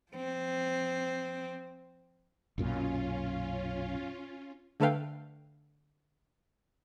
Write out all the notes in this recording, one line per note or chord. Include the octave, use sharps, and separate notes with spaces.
F3 C4
B1 F#2 A#2 C#4 F4
D3 A3 A4 B4 F5 G5